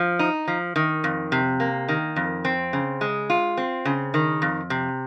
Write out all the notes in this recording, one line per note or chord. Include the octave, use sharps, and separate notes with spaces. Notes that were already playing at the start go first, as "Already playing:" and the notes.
Already playing: F3
D#4
F3
D#3
F2
C3
A#3
D#3
F2
C4
C#3
G#3
F4
C4
C#3
D#3
F2
C3